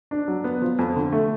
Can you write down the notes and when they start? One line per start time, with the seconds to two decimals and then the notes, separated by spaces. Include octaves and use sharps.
0.11 D4
0.28 F#3
0.44 B3
0.62 F3
0.79 F2
0.96 D3
1.13 A3